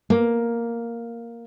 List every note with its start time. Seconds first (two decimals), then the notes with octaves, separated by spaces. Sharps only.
0.10 A#3